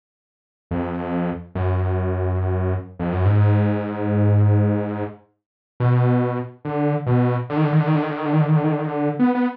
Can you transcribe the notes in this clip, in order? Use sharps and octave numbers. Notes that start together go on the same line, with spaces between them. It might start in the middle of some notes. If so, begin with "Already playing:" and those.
F2
F#2
F2
F#2
G#2
B2
D3
B2
D3
D#3
D3
D#3
D3
D#3
D3
D#3
D3
D#3
D3
D#3
D3
D#3
D3
D#3
D3
D#3
D3
B3
B3